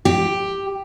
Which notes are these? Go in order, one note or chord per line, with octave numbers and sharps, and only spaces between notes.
G4